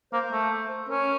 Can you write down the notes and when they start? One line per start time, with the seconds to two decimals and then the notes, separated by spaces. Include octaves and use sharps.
0.13 A#3 C5
0.32 A3
0.89 C#4 A#4